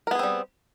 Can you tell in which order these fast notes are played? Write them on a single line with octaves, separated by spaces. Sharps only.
A#4 B3 G#4 C4 G3